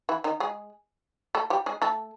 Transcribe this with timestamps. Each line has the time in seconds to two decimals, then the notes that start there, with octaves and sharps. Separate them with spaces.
0.09 E3 E4
0.24 D#3 D#4
0.40 G#3 G#4
1.35 A3 A4
1.50 G3 G4
1.66 G#3 G#4
1.82 A3 A4